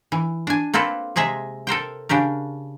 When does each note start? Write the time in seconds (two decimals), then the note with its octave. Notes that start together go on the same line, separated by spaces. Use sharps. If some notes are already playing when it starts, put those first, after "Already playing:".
0.12 E3
0.47 D4 G#5
0.74 A#3 C4 F4 A4 B4
1.16 C3 G#3 G#4 D#5 E5
1.67 A4 A#4 C5 G5
2.09 C#3 D4 G4 A#4